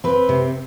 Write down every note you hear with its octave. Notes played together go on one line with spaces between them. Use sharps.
C4 B4
C3